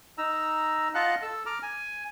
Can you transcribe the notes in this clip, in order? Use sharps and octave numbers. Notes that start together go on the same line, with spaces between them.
D#4 A#5 E6
F4 D#5 F5 F#5 A5 F#6
A4 E6
A#5 D6 F6
G#5